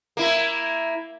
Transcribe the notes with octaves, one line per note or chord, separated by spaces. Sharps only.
A#3 E4